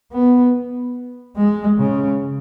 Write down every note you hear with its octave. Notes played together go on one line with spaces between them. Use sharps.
B3
G#3
C#3